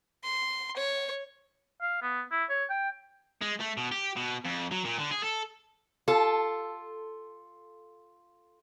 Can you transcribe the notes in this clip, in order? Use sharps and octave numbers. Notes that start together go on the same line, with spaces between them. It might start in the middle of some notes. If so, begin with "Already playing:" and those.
C6
C#5
F5
B3
E4
C#5
G5
G#3
A3
B2
G4
B2
F2
F#3
A#2
D3
G#4
A4
F4 A4